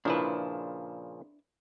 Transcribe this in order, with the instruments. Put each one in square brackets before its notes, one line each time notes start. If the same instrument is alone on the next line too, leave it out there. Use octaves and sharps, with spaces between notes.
[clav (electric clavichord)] A#2 C#3 F3 [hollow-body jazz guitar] D4 E4 B4